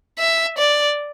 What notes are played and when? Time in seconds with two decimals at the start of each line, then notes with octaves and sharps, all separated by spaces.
0.19 E5
0.58 D5